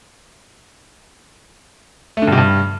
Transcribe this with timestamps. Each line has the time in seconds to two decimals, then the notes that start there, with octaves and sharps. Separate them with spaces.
2.17 A3
2.22 D3
2.27 G2
2.32 C3
2.37 G2